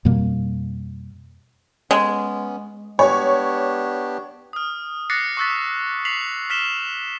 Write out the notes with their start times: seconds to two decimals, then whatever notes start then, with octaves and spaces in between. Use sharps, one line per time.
0.05 F2 B2 G3 A#3
1.91 G#3 B3 C#4
2.99 B3 D4 G4 C#5
4.53 D#6 F6
5.10 D6 F#6 A6 A#6 C7 C#7
5.37 C#6 D6 E6 F#6 A6 B6
6.05 B6 C7 F7 F#7
6.50 F6 B6 E7 G7